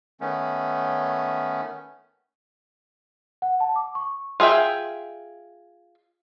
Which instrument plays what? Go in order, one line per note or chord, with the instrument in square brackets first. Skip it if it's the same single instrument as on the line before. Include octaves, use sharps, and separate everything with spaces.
[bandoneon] D#3 A3 B3 C#4
[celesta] F#5
A5
D6
C#6
[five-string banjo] F4 G#4 A#4 E5 G5